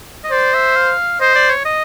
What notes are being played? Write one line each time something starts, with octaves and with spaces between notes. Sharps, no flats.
D#5
C5 D5
E5
F5
C5 D#5
D5
C#5
D#5